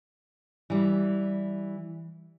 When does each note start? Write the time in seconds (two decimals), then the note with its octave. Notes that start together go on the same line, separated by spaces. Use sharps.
0.70 E3 G3